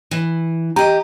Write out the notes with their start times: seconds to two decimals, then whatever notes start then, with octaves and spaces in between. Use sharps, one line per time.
0.11 E3
0.76 G4 D#5 A#5